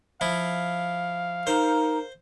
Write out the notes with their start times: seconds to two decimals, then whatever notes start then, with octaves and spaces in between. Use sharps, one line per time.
0.21 F3 E4 F5
1.47 D#4 A#4 C5